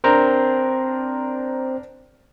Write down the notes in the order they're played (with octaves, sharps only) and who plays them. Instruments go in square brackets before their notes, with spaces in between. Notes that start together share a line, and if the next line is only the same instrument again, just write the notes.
[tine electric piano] C4 C5 A#5 [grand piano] D4 A#4